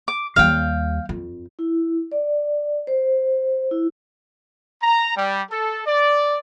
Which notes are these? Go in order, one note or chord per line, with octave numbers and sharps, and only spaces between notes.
D6
D#2 G3 F5 G5
F2
E4
D5
C5
E4
A#5
G3
A4
D5